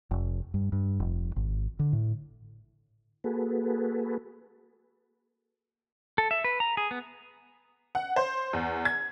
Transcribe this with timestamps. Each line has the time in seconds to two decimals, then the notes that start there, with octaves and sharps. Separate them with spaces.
0.11 F1
0.54 G2
0.72 G2
1.00 F1
1.36 G#1
1.79 D3
1.93 A2
3.24 A#3 F#4 G#4 A4 B4
6.18 A4
6.31 E5
6.44 B4
6.60 A#5
6.77 G#4
6.91 B3
7.95 F#5
8.16 C5
8.53 E2
8.85 G#6